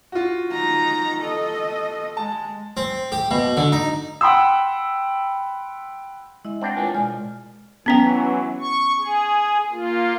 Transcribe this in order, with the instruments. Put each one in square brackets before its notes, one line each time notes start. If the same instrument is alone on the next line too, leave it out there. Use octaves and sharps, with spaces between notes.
[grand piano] F4 F#4
[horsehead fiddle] D#4 A#5
A4 D#5
[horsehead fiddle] G#3 [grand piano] A5
[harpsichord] C4
G4
B2
D3
D#4
[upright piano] F#5 G5 B5 C6 E6
[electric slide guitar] G#3 [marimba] E4 D#5 E5
[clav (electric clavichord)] C4 D4 G5 [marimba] F#5 B5 D6
[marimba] F4 A#4 [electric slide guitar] B4 C#5 G#5
[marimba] B2 D5 F6 [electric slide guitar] G#3 [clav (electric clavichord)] G#5
[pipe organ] E3 F#3 [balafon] B3 C#4 G5
[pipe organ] C#6
G#4
A#3 F4